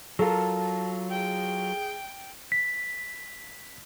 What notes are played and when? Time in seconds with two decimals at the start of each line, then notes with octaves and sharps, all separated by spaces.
0.19 F#3 F4 A4 A#4 A5
1.10 G#4 G5
2.52 B6